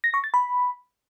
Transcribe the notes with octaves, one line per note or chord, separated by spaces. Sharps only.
A#6
C#6
A6
B5